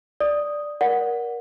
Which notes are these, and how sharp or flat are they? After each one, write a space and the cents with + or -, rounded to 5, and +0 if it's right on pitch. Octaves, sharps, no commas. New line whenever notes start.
D5 +0 D#6 +0
A#4 +20 D5 -20 F#5 -10